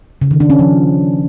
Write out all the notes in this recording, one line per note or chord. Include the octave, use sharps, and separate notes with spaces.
C#3
D#3
D4
C#4
F3